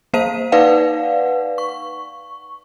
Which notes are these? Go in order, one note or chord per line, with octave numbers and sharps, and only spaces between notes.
A#3 C5 F5 D#7
D#4 B4 D5 F5 F#5
C#6